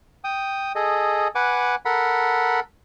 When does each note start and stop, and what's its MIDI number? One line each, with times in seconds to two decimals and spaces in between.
0.24 0.72 79
0.24 0.72 87
0.75 1.28 68
0.75 1.28 69
0.75 1.28 75
1.35 1.75 71
1.35 1.75 78
1.35 1.75 80
1.35 1.75 86
1.85 2.60 69
1.85 2.60 70
1.85 2.60 78
1.85 2.60 83